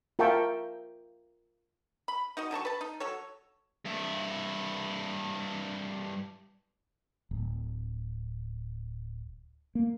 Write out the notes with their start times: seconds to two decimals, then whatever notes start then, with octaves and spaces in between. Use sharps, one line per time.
0.19 F4 A#4 E5 G5 A5 C#6
2.08 B5
2.37 D#4 F#4 D#5
2.51 D3 F#3 A5 C#6
2.65 B4 A5
2.81 D#4
3.00 F#3 A4 C#5
3.85 G2 E4
7.31 D1
9.75 A#3